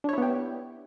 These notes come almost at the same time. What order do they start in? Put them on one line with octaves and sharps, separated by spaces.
D4 C#5 E4 B3 G4